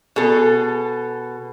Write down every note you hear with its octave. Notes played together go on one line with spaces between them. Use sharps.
B2 G#4 A4